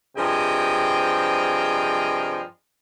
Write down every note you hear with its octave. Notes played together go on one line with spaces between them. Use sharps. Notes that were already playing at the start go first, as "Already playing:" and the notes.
G2 C3 F3 G#4 D#5 G5